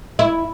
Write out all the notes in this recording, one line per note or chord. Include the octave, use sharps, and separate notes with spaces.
E4